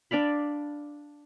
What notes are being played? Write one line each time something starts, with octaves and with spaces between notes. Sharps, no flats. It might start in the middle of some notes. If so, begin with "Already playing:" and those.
D4 D5 F5 B5